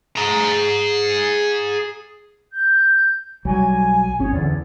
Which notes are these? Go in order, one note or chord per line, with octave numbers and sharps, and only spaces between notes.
G#4 A#5
G6
B1 F#3 G3 G#5
G1 C4 C#4 G#4 C#5
E2 D3 D5